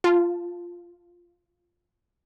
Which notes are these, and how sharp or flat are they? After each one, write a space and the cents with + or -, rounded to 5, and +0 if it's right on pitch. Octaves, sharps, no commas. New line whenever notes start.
F4 +0 A5 +0